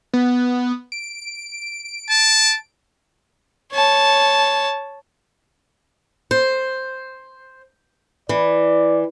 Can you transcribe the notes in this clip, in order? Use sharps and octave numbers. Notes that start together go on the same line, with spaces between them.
B3
D7
A5
C#5 A5
C5
E3 D5